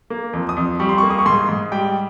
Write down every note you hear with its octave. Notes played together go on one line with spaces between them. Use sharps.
A#3
F2
D#6
F2
G3 C#6
C6
A#3 C#6
D#6
C#6
G#2 C6
G#2
G3 G5